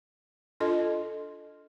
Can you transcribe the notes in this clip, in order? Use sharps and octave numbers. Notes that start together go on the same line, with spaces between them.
D4 F4 A4 D#5